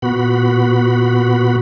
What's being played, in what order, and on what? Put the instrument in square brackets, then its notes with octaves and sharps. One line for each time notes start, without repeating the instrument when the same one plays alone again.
[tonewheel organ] A#2 B3 F#4 B5